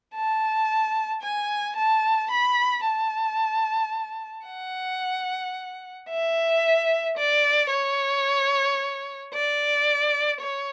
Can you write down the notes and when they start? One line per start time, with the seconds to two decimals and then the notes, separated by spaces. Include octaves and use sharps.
0.15 A5
1.22 G#5
1.77 A5
2.31 B5
2.84 A5
4.46 F#5
6.10 E5
7.18 D5
7.71 C#5
9.34 D5
10.41 C#5